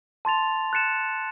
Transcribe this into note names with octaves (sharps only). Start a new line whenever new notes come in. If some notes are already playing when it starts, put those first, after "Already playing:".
A5 C6 A6 F7
F#6 A6 C#7 E7